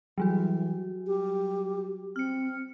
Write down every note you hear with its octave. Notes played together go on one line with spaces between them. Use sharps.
E3 F#3 G3 F#4
G4
C4 F6 C#7